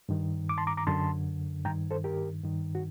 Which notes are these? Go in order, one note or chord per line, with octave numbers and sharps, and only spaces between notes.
G2 D#3
D6
A5 C6
A#5 D6
A#5 D6
F#2 D3 A5 C6
G2 D#3 G5 A#5
A4 C5
G4 A#4
G2 D#3
F#4